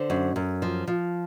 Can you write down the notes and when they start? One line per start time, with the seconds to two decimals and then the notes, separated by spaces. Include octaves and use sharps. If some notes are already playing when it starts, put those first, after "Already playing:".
Already playing: D3 C5
0.10 F#2
0.36 F#2
0.62 F3
0.87 F3